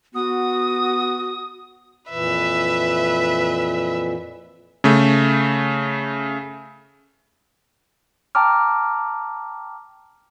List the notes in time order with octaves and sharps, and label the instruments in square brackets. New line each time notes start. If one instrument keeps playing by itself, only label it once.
[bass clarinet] B3 [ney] F#4 [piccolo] D#6
[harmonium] F2 A#2 E3 [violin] B4 E5
[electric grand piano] C#3 A3
[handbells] G5 A5 A#5 D6 F6